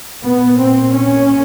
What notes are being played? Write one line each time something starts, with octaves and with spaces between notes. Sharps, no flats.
A#2 B3
C4
C#4